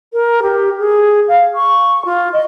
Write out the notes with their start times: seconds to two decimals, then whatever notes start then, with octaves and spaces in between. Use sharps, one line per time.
0.13 A#4
0.42 G4
0.79 G#4
1.28 F5
1.55 C#6
2.05 F4
2.33 D#5